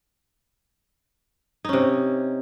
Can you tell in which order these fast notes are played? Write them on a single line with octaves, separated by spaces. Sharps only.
D#4 C#4 C3